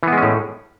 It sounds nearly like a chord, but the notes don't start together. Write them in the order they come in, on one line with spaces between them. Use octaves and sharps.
E3 B3 G#3 C#4 A2